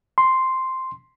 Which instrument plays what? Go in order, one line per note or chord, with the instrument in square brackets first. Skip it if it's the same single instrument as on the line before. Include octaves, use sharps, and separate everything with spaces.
[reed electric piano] C6